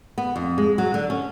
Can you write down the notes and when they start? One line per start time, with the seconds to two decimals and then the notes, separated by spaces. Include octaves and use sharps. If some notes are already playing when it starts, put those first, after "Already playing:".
0.18 B3
0.36 F2
0.58 G#3
0.78 F#3
0.94 D3
1.10 C#4